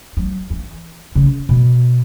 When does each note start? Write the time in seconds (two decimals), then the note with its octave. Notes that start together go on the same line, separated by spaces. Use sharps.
0.17 F#3
0.50 E3
1.15 C#3
1.49 B2